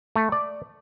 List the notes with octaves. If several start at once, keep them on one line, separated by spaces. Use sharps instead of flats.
A3
D5